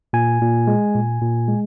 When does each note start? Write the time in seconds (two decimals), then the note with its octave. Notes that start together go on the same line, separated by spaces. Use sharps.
0.13 A#2 G#5
0.41 A#2
0.67 G#3
0.95 A#2
1.21 A#2
1.48 G#3